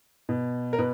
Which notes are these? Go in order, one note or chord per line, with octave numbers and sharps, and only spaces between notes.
B2
A#4
B2 B4